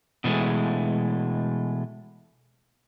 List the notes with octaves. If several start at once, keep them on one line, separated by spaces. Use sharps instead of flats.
B2 E3 F3 G#3 A3